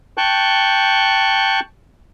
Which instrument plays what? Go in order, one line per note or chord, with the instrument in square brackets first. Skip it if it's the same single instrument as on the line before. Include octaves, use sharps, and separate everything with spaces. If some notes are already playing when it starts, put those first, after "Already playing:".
[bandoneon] G5 A5 C#6 F#6 G6